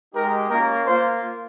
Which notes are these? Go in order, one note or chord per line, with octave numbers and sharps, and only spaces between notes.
G#3 D#4 G4 A#4
A#3 C#4 F4 A#4
A#3 F4 C5